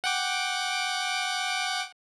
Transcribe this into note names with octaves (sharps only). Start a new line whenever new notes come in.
F#5 G5 D6